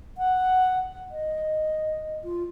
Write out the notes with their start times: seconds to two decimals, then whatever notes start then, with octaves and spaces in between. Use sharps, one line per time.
0.18 F#5
1.11 D#5
2.24 F4